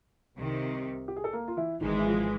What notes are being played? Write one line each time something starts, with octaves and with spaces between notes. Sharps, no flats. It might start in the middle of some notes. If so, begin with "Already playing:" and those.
C2 C3 D#3
G4
G#4
A4
A#3 A#4
F4
E3 E4
G#1 G#2 D#3 E3 G#3 D#4
E4
F3 F4